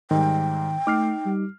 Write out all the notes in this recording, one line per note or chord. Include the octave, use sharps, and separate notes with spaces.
G#2 D#3 G3 G5
A3 D#4 D6 F6 C7
G3